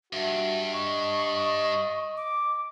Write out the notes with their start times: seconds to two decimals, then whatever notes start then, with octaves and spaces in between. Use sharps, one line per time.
0.13 G2 F#4 E5
0.73 D#5 C#6
2.17 D6